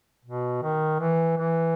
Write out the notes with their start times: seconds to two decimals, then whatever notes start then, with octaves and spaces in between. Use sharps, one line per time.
0.25 B2
0.63 D#3
1.00 E3
1.37 E3